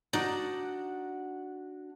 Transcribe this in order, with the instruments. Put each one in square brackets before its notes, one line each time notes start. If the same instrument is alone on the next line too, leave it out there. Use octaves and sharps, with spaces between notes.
[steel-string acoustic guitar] D4 F#4 F#5 [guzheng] D#4 D5